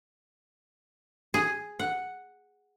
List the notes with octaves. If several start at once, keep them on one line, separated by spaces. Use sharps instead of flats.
G#4
F#5